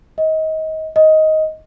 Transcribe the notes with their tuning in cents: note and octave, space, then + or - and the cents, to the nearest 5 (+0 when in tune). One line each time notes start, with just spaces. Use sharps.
D#5 +25
D#5 +10